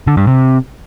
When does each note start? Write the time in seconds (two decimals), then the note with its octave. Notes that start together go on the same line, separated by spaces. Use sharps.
0.07 D3
0.17 G2
0.27 C3